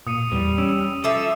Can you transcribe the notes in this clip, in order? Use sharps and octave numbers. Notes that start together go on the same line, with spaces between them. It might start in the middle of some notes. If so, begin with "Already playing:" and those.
A#2 D#6 C#7 D#7
E2 G3
C#4 E6 D7 E7
F3 A4 E5 D6 C7